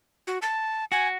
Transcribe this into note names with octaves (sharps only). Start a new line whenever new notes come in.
F#4
A5
F#4 G#5